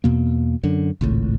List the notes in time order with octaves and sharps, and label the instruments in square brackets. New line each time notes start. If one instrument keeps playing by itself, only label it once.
[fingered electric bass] E2 B2 A#3
F#2 D3
G#1 C#2 A2